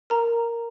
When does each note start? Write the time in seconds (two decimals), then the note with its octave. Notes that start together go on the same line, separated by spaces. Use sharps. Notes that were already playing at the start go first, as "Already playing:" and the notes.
0.10 A#4 A#5